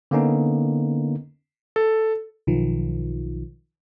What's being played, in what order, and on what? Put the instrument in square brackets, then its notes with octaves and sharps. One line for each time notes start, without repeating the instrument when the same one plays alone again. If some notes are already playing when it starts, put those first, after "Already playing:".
[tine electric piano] D3 A#3 B3 C#4 D#4
[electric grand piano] A4
[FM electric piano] B1 D#3 F3